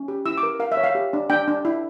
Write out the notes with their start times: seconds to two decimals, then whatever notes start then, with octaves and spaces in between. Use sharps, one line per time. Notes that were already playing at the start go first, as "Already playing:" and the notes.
Already playing: C#4
0.08 G4
0.26 E4 E6
0.37 D6
0.43 A#4
0.60 A#4 F5
0.72 E5
0.77 C#5
0.84 F5
0.95 G4
1.13 D4
1.30 D4 G5
1.48 D4
1.65 E4